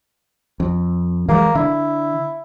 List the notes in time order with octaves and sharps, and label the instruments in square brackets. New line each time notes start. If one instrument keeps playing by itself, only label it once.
[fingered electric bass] F2
[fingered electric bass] E3 F#3 G#3 [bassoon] A#3
[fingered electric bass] D3 D4 [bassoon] E4